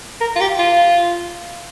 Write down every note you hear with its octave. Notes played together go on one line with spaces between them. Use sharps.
A#4
F4
G4
F4